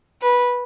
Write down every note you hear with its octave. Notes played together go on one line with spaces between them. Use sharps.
B4